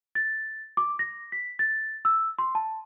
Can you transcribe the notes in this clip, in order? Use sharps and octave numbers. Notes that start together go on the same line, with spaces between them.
A6
D6
A#6
B6
A6
E6
C6
A5